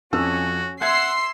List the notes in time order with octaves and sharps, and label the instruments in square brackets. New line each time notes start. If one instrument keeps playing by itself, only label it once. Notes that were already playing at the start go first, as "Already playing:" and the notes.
[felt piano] F2 F3 E6 [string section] C#4 [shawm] F#4
[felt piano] E5 G#6 [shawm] F#5 [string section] C6 E6 C7